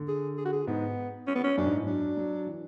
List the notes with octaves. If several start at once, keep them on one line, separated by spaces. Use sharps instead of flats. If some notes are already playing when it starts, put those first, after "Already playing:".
Already playing: D3
G#4
G#4
F#4
G#4
G#2 B3
C#4
B3
C#4
F#2 D4
G#2
A2
F#3 D4
F#3
E3